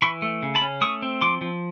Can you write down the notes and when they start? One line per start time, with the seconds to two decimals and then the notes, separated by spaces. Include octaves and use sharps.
0.02 E3 B5 C#6
0.22 A3
0.43 C#3
0.55 A5 B5
0.62 C#4
0.81 A3 C#6 D#6
1.02 C4
1.21 F3 C6 D6
1.41 F3